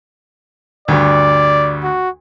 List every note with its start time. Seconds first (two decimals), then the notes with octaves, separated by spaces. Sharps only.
0.88 D2 G2 D5
1.84 F#4